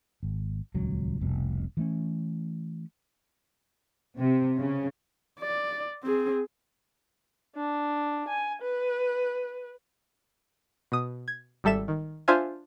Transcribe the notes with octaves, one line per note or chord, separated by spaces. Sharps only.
G#1
D#1 C#2 F#3
F1 C2 B2
E3 A3 C#4
C3
C#3
D5
C4 G#4
D4
G#5
B4
B2 D#6
G#6
G#1 G3 A4 E5 E7
D#3
D4 F4 C5 E5 F5 G#5